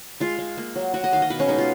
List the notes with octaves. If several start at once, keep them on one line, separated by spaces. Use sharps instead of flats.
G#3 F4
G#3
A#3
F#3
F#3 F#4
D#5
D#3 F5
D#5
B2 B4
C#4
G#3 D#4
F4